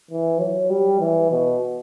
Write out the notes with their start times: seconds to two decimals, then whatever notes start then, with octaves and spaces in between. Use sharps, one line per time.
0.11 E3
0.40 F#3
0.70 G3
1.00 E3
1.31 B2